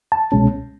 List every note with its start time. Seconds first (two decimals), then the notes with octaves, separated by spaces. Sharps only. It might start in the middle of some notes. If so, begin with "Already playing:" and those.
0.12 A5
0.32 C2 B2 G#3 C#4